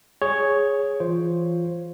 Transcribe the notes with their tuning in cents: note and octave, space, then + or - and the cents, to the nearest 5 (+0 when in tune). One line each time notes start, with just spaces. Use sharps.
G#4 +0 C#5 +0
E3 +30 F4 +0 C5 +0